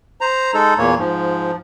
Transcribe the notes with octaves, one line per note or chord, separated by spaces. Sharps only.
C5 A#5
G#3 D#4 A4
E2 A#2 A#3 C#5
G#2 F3